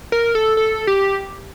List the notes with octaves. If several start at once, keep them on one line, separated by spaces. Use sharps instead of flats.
A#4
A4
A4
G4